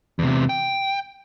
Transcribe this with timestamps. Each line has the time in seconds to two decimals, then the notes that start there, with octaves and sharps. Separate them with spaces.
0.19 E2 C3
0.49 G5